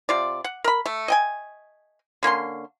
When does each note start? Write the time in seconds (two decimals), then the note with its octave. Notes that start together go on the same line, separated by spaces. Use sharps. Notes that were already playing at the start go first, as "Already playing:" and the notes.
0.09 C3 F4 D5
0.44 F#5
0.64 A#4 B5
0.86 A3
1.08 D#5 G5 G#5
2.23 D3 A#3 C#4 C6